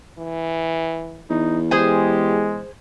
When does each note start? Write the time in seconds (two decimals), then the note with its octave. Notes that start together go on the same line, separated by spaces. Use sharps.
0.19 E3
1.30 E2 D#4
1.71 G#3 G4 G#4 C5 G#5